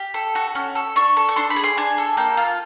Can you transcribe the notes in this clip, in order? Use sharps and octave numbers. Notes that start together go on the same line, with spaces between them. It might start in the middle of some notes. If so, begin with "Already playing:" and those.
Already playing: G4
A4
F#4
C#4
A4
D4 C#6
A4
C#6
D4 C6
B5
G#4
C6
D4 G#5
A4
A#3 G5
F4